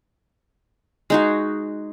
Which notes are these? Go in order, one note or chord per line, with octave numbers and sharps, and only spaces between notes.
G#3 D#4 F#4